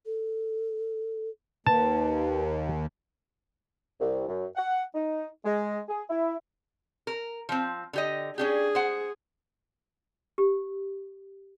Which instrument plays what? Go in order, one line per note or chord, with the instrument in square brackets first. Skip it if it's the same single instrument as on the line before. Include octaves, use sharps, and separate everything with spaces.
[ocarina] A4
[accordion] D#2 [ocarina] B4 [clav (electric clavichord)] A5
[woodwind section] C2
F#2
F#5
D#4
G#3
G#4
E4
[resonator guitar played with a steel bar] A#4
F3 C4
D3 G4 D#5
[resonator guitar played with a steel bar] C#4 D4 G4 [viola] G#4
[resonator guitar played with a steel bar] C5 F#5
[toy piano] G4